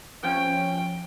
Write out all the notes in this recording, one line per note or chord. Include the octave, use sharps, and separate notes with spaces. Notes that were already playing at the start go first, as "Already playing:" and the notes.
F3 C#4 G5